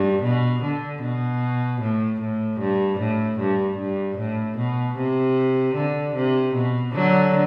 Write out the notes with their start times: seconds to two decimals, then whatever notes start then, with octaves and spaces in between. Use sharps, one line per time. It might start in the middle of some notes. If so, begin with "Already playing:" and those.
Already playing: G2
0.23 B2
0.62 D3
1.02 B2
1.82 A2
2.20 A2
2.60 G2
3.00 A2
3.39 G2
3.78 G2
4.18 A2
4.58 B2
4.97 C3
5.76 D3
6.16 C3
6.54 B2
6.94 D3 F#3